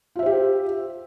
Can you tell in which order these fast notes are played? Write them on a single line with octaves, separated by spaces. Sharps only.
F4 E5 C5 G4